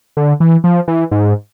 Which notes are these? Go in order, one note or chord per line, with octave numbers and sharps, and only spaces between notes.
D3
E3
F3
E3
G#2